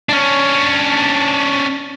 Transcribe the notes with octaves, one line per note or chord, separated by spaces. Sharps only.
C#4 D4